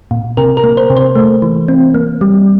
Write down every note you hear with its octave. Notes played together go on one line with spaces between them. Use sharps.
A#2
C3 A#4
A#4
A#3
C5
C3
C5
A3
E3
C4
A#3
G3